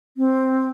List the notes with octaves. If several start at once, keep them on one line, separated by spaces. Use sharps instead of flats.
C4